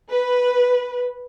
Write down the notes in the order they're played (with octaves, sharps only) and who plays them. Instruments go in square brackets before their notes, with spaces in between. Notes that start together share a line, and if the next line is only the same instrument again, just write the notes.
[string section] B4